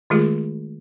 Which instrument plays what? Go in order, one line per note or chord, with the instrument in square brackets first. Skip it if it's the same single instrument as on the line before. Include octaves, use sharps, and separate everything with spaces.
[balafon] D#3 G#3 A3 F4 G4 G#4